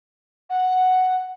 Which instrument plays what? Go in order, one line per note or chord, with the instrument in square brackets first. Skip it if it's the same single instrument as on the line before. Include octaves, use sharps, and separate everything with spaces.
[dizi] F#5